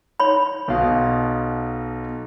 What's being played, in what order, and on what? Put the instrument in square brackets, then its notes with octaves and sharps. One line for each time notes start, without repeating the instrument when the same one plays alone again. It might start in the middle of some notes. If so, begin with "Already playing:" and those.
[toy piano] C#5 B5
[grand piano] B1 B2 F5